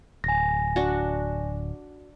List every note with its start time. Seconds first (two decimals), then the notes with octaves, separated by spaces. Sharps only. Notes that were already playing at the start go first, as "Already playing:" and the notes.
0.24 D1 G#5 A#6
0.76 D4 F#4